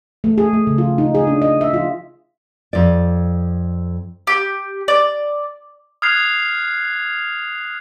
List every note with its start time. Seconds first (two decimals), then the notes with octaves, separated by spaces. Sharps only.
0.24 A3
0.38 G#4
0.53 A3
0.67 C#3
0.78 F4
0.98 D#4
1.15 G#4
1.27 D4
1.42 D#5
1.61 E5
1.74 F4
2.73 F2 D5
4.27 G4
4.88 D5
6.02 D#6 F6 F#6 G#6 C7 F7